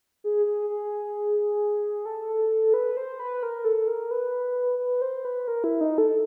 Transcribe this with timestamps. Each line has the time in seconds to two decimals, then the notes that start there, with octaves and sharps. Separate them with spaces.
0.24 G#4
0.46 G#4
0.70 G#4
2.06 A4
2.74 B4
2.97 C5
3.20 B4
3.43 A#4
3.65 A4
3.88 A#4
4.11 B4
4.79 B4
5.02 C5
5.25 B4
5.48 A#4
5.64 E4
5.81 D#4
5.98 A4